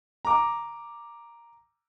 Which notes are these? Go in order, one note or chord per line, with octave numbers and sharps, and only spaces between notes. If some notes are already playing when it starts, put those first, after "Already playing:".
A#5 D6